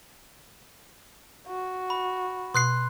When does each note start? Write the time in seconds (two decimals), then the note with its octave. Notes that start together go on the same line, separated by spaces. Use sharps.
1.48 F#4
1.90 B5
2.54 B2 C6 F#6 C7